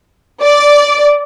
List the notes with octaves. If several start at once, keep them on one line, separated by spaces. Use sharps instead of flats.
D5